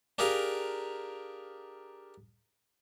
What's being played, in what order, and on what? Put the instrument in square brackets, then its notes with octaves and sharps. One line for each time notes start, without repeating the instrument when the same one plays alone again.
[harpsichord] D4 G4 G#4 A#4 F5 A#5